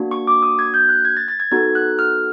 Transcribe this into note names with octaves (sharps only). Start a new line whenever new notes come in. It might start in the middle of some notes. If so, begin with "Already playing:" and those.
Already playing: A#3 D4 F#4
C#6
D6
D#6
G#6
G6
F#6
G#6
A6
A6
G#6
B3 D#4 F#4 A4 G#6
F#6
F6